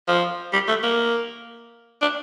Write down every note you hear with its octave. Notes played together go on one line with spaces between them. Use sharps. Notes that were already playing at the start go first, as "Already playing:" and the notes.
F3
G3
A3
A#3
D4